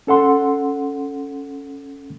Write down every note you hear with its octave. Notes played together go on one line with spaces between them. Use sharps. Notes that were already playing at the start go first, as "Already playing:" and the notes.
C#4 A4 F#5 C6